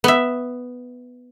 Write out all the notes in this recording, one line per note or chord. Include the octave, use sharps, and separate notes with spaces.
B3 E5